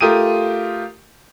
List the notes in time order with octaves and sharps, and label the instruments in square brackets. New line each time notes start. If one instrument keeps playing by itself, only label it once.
[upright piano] A3 F4 G4 A#4 D#6 D#7